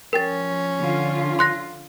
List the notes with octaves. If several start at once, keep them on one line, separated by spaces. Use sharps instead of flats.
F3 C#4 A#4 G5 A6
D3 F4
C6 F#6 A#6